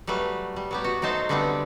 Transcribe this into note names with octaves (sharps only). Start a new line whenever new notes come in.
F#3 G3 A3 B4
G3
F#3 B3 G4
F#4
F#3 A3 D#4 C5 A5
D3 G3 A3 B3 C4 D4